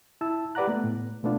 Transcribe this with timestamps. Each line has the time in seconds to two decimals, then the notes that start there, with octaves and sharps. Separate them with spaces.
0.21 E4 A5 E6
0.55 G4 B4 D5 F#5 A#5 F#6
0.68 A3 B3
0.84 A2
1.23 B2 A3 B3 D4 F4